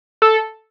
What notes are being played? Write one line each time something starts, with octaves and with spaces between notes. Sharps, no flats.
A4